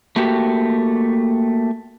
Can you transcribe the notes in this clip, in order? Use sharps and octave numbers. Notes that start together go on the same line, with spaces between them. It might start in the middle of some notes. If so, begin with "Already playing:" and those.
A3 A#3 F#4 G4